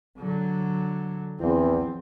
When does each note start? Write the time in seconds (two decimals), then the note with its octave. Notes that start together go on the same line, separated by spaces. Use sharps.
0.18 D3 F#3
1.40 E2 F3 C4